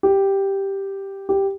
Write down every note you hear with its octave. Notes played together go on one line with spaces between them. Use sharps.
G4
G4